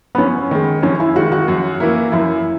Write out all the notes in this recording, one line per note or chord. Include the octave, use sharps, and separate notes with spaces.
B3
F#2 C#4
D#3 G#3
F#2 C#4
E4
D#3 G#3 F#4
F#4
F#2
E3 A#3 E4 A#4
F#2 E4